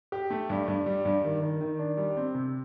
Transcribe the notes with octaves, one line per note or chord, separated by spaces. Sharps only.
G4
A3
G2
G2
G3
G2
D#3
D#3
D#3
D4
G3
C4
C3